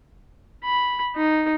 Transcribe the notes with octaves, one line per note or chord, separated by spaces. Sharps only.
B5
D#4